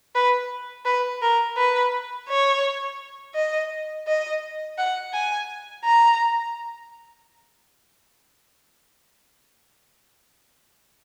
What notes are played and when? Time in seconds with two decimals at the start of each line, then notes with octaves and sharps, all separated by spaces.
0.15 B4
0.85 B4
1.22 A#4
1.57 B4
2.29 C#5
3.35 D#5
4.07 D#5
4.78 F#5
5.14 G#5
5.85 A#5